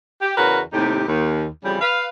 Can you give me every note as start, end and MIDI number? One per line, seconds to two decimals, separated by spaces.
0.21 0.37 67
0.38 0.60 40
0.38 0.60 49
0.38 0.60 66
0.38 0.60 70
0.38 0.60 71
0.73 1.03 39
0.73 1.03 45
0.73 1.03 48
0.73 1.03 63
0.73 1.03 67
1.08 1.46 39
1.65 1.78 41
1.65 1.78 49
1.65 1.78 52
1.65 1.78 55
1.81 2.08 71
1.81 2.08 77